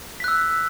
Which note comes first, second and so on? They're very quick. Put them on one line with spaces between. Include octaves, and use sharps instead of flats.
B6 F#6 E6